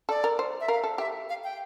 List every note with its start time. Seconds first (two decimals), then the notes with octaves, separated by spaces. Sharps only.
0.09 A4 D5
0.24 A#4
0.39 C5
0.60 E5
0.68 A#4 F5
0.84 A4
0.98 G4 E5
1.29 F5
1.44 G5